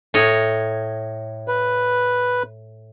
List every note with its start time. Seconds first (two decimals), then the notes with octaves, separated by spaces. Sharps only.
0.14 A2 C#5 D#5
1.48 B4